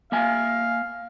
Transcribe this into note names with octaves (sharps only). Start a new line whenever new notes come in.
A#3 E5 F5 G#5